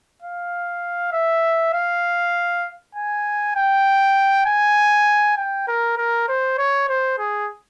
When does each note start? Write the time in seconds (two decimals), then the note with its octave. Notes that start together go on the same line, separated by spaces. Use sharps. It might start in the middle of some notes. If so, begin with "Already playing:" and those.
0.23 F5
1.12 E5
1.74 F5
2.95 G#5
3.56 G5
4.46 G#5
5.37 G5
5.68 A#4
5.97 A#4
6.28 C5
6.58 C#5
6.89 C5
7.18 G#4